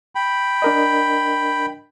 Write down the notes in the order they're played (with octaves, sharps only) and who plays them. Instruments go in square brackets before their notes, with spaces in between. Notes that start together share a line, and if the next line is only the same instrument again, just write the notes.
[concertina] G5 B5
[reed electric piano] D4 A#4 D#5